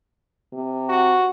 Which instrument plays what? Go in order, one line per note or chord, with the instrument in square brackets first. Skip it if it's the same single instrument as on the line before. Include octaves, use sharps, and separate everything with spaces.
[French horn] C3
[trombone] F#4